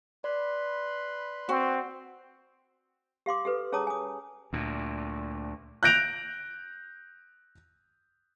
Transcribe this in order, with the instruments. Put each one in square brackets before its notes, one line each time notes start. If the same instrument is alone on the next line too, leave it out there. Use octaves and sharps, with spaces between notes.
[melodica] B4 B5 C6 [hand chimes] D5
[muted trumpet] C4 [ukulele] F#4
[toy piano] G4 F5 C6 D6
G4 A4 B4
C#4 G#4 C#5 A5 A#5 D#6
G#5 D#6
[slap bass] D2 A#2
[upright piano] F#6 G6 A#6 D7 F7